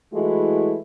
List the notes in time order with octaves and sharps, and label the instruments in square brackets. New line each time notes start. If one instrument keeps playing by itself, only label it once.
[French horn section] E3 G#3 A3 E4 F#4